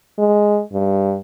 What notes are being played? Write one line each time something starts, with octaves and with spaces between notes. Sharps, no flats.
G#3
G2